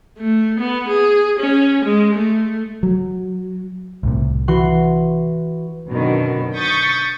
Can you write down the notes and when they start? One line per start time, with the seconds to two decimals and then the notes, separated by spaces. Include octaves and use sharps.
0.18 A3
0.59 B3
0.88 G#4
1.39 C#4
1.85 G#3
2.15 A3
2.83 F#3
4.03 C2 A2 C3
4.48 E3 F#4 C6
5.88 F#2 B2 D3 D#3
6.57 C#6 D#6 G6 A6 B6